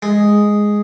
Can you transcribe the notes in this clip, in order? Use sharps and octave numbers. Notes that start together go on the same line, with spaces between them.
G#3